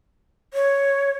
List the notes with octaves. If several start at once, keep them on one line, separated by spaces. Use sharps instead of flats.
C#5